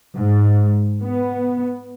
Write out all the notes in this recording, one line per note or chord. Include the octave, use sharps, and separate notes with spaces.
G#2
B3